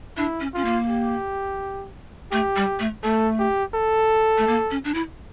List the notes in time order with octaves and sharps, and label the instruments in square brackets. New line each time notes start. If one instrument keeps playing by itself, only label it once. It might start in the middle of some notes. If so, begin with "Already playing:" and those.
[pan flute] D4 [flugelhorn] E4
[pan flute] C#4
[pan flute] C#4 [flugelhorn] F4
[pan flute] A#3
[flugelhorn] G4
[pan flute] A3 [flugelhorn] G4
[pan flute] G3
A3
[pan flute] A3 [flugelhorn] A4
[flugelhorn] G4
A4
[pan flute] A3
A#3
C#4
D4
E4